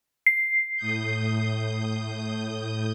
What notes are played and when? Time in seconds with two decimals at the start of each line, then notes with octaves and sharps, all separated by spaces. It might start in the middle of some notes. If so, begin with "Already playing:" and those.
0.26 C7
0.77 A2 D#6 G6